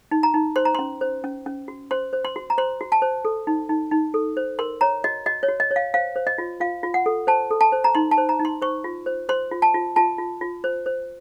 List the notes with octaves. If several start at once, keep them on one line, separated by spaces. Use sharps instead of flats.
D#4
A#5
D#4
C5 C6
A#5
C#4 C6
C5
C#4
C#4
F#4
C5 C6
C5
C6
F#4
A#5
C5 C6
F#4
A5
C5
A4
D#4
D#4
D#4
A4
C5
A#4 C6
C#5 A#5
F#4 D#5
F#4 D#5
C#5
F#4
D#5
C#5
F5
C5 F5
C5
D#5
F4
F4 F5
F4
F#5
A4
C5 A5
A4
A5
C5
A#5
D#4 C6
A5
C5
A#5
D#4
C6
C5 C#6
F4
C5
C5 C6
F4
A5
F4
F4 A5
F4
F4
C5
C5